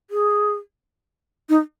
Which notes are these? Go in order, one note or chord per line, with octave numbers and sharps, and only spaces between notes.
G#4
D#4